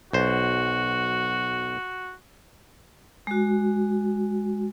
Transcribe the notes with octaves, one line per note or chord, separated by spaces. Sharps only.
B1 F#4 C5
G#3 F#4